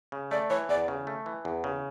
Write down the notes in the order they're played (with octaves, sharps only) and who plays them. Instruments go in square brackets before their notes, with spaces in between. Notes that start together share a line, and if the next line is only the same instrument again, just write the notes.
[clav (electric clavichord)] C#3
[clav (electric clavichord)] A3 [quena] D5
[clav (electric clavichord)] E3 [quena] C#5
[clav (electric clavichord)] E2 [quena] D5
[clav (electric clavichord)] C#3
A3
E3
E2
C#3